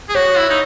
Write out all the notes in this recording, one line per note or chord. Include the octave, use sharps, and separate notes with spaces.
G#4
F#4 C#5
E4
D#4